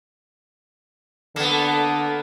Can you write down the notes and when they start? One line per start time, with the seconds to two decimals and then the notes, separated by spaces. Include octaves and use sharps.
1.36 D3 A#3 B3 A4